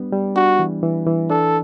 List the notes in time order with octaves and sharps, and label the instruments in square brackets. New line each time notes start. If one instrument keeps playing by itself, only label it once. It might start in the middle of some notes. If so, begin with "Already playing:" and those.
Already playing: [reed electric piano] G3 B3 D4
G3
[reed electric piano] D4 [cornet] F#4
[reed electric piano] E3
E3
E3
[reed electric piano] D4 [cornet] A4